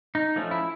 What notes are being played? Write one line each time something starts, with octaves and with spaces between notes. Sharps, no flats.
D#4
F3 A3 C#4
E4